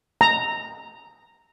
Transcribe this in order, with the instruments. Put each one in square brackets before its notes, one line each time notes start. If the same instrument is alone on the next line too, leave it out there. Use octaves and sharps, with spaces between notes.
[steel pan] A#5